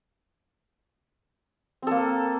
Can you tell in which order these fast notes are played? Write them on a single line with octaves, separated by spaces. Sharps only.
C4 A4 A#3